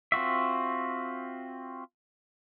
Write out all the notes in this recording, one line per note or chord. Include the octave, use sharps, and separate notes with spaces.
C4 F4 F#4 E5